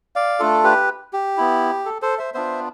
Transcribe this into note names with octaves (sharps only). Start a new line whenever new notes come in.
D5 F5
A3 D4 F4 A4
G4 B4
G4
B3 E4
A4
A4 C5
C5 E5
B3 D4 F4 C5 E5